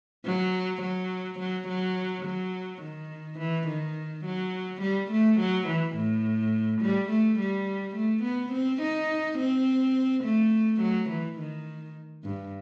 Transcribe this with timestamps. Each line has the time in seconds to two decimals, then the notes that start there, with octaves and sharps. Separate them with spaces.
0.25 F#3
0.82 F#3
1.40 F#3
1.68 F#3
2.26 F#3
2.82 D#3
3.39 E3
3.68 D#3
4.26 F#3
4.82 G3
5.11 A3
5.40 F#3
5.68 E3
5.96 A2
6.82 G3
7.10 A3
7.40 G3
7.96 A3
8.24 B3
8.53 C4
8.82 D#4
9.39 C4
10.24 A3
10.81 F#3
11.10 E3
11.39 D#3
12.24 G2